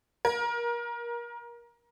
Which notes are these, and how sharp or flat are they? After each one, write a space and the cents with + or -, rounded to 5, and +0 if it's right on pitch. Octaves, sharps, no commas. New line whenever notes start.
A#4 +25